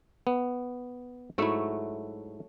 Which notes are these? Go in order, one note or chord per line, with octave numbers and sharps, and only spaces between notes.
B3
G#2 F#3 A3 E4 F#4